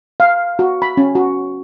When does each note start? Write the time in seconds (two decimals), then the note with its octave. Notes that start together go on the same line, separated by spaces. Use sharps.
0.20 F5
0.59 F#4
0.82 B5
0.97 C#4
1.15 F#4